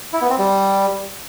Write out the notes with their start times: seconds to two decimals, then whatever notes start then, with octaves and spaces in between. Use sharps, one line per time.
0.13 E4
0.21 B3
0.30 C4
0.38 G3